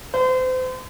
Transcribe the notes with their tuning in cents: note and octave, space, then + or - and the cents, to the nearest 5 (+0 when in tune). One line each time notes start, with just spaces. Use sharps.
C5 -35